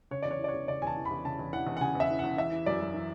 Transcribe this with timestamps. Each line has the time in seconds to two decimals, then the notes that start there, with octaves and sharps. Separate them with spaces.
0.11 C#3 C#5
0.23 D5
0.25 E2
0.31 C#5
0.39 E3 D5
0.48 C#5
0.54 E2
0.68 C#3 D5
0.82 E2 G#5 A5
0.97 E3
1.05 B5
1.11 E2
1.25 C#3 A5
1.39 E2
1.53 E3 F#5
1.67 E2
1.77 F#5
1.81 C#3 G#5
1.95 E2 E5
2.10 E3
2.19 F#5
2.24 E2
2.37 E3 E5
2.52 E3
2.66 F#2 D5
2.81 F#2
2.94 E3